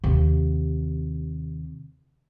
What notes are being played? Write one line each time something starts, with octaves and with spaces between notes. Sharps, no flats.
D#2 C3